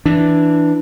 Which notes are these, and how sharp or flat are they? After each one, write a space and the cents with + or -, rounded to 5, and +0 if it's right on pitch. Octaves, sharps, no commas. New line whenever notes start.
E3 +0 D4 +0